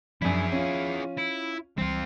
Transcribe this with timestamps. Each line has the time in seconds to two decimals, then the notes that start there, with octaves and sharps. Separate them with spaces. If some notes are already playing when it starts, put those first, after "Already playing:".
0.22 F#2 F3 D4 E4 G#4
0.52 C#4 F4
1.17 E4
1.78 C#2 E3 G3 C4 F4